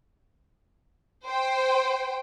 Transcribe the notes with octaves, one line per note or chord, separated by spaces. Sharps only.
C5 G5